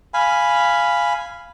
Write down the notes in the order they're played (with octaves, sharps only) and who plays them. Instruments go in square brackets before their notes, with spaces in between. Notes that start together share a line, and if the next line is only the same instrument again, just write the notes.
[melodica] F5 G#5 B5